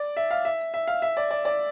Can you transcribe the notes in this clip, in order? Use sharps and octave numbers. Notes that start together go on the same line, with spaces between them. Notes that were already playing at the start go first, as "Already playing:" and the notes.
Already playing: D5
E5
F5
E5
E5
F5
E5
D5
D5
D5